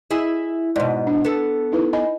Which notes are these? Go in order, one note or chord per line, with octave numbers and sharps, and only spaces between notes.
E4 G#4 D#5
G#2 B2 D5 C6
D4
B3 A4
D#4 E4 B4
D#5 G#5 B5